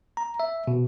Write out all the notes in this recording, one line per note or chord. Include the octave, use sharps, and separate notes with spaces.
A#5
E5
B2